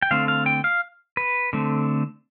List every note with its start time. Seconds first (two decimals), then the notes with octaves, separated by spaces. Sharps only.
0.02 G5
0.11 D3 A3 C4 F5
0.28 F5
0.46 G5
0.64 F5
1.17 B4
1.53 D3 A3 C4